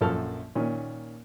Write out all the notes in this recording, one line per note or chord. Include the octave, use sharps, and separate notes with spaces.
A#1 F#2 F3 F#4 A4 F6
A#2 D#3 C#4